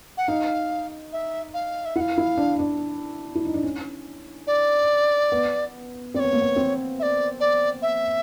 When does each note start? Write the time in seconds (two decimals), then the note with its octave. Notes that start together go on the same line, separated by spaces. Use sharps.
0.18 F#5
0.28 D#4 F5
1.13 E5
1.54 F5
1.85 E5
1.96 E4 F#5
2.01 F5
2.18 E4
2.37 D4
2.59 D4
3.35 E4
3.45 D#4
3.54 D4
3.63 C#4
4.47 D5
5.32 B3
6.14 C4 D5
6.20 B3 C#5
6.33 A#3
6.41 B3
6.56 C4
6.99 E5
7.03 D5
7.40 D5
7.82 E5